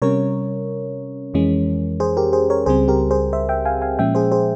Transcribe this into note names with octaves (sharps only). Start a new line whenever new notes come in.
C3 G3 C#4 A#4 C#5
F2 E3 G#3 C#4
G#4 C5
G4 A#4
G#4 C5
A#4 C#5
C#2 C#3 G3 C4 G#4 C5
G4 A#4
G#4 C5
C5 E5
E5 G5
F5 G#5
F5 G#5
A#2 F3 G#3 C#4 E5 G5
G#4 C5
G#4 C5